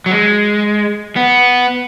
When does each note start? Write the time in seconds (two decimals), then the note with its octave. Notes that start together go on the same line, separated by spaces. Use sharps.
0.06 F#3
0.11 G#3
1.16 B3